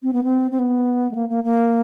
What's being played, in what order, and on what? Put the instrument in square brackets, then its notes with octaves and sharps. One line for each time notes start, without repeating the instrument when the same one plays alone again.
[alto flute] C4
B3
C4
C4
B3
A3
A#3
A#3
A#3